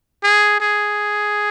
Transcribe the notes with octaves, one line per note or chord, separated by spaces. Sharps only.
G#4
G#4